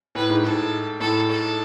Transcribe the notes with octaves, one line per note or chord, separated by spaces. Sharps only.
A2 B4
G#2
G#2 A4
A2 A4
A4